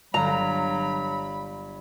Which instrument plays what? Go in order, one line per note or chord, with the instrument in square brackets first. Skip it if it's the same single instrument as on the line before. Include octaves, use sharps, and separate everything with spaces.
[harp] G1 F5 [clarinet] F#3 [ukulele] A#5 [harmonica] B5